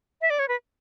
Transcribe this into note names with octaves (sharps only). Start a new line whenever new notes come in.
E5
D5
C#5
B4